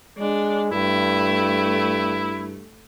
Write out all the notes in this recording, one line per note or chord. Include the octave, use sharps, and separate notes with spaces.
G#3 D4
G2 A3 E4